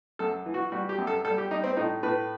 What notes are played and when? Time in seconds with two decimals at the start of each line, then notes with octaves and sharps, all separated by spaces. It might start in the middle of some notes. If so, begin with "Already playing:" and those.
0.19 F#2 A4
0.46 E3
0.54 F#4
0.72 G3 F#4
0.89 G4
0.98 F#2
1.07 A4
1.25 G3 A4
1.38 G4
1.51 G3 D#4
1.64 C4
1.77 A2 D#4
2.03 A2 B4